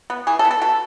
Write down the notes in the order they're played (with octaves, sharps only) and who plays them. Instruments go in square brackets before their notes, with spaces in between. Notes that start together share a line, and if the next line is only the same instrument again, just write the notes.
[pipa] B3
E3 G#4
A4
B3
A4
B2 A4